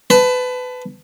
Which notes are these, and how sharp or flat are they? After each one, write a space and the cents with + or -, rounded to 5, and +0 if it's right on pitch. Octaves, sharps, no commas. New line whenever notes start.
B4 +25 A5 +0